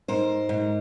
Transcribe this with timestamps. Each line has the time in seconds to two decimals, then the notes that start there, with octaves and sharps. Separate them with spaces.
0.08 G#2 A#4 C5
0.49 G#2